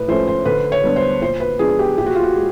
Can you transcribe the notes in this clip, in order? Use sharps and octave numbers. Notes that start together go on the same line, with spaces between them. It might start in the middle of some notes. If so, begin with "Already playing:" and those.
Already playing: A2 B4
F3 A3 C#4 C5
C5
D3 B4
C#5
G3 B3 D4
C5
A#2 C5
B4
F3 G#3 B3 D4 G#4
G4
A#2 G4
F#4
F4
F#4
G#3